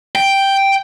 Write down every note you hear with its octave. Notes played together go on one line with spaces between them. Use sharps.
G5